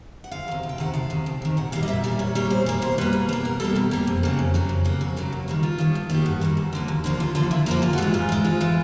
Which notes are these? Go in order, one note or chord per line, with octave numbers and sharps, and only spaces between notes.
F#5
D2 F5
D#3
C3
D2
G5
C3 D#3 F#5
D2 F5
C3 D#3
D2
C3 D#3
A#2 F#5
G3 A#3 F5
D#5
A#2 E5
G3 A#3 D5
A#2 C#5
G3 A#3 C#5
A#2 C5
G3 A#3
B2 C5
G3 A#3 B4
B2
G3 A#3
B2 A#4
G3 A#3 A4
B2 G4
G3 A#3
F2
C#3 F#3 A#3
F2
C#3 F#3 A#3
F2
C#3 F#3 A#3
F2 F#4
C#3 F#3 A#3
G2
D#3 G3 A#3
G2 F4
D#3 G3 A#3
G2
D#3 G3 A#3 G4
G2 F#4
D#3 G3 A#3
D#2
D3 F3 A#3
D#2
D3 F3 A#3
D#2 F4
D3 F3 A#3 F4
D#2 E4
D3 F3 A#3 F4
G#2 F4
F#4
E3 G#3 F4
G#2
E3 G#3
G#2 F4
E3 G#3